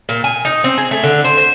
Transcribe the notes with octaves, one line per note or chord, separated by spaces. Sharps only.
A#2
G#5
D#4
C4
G#4
A3
D3
C5
C5